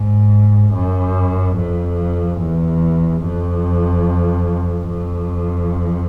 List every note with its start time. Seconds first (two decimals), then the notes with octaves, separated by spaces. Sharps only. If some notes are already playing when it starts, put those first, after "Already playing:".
Already playing: G#2
0.74 F#2
1.56 F2
2.40 E2
3.22 F2
4.87 F2